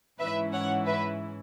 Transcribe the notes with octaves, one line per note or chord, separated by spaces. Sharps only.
G#2 E3 C#4 E4 B4 E5
C#5 F#5
B4 E5